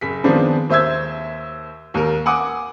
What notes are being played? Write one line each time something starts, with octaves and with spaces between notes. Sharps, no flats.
F#1 B6
D#3 F3 G#3 B3 C4 D4
D#2 C5 E5 E6 G#6
D#2 A#4
F#5 G#5 D6 D#6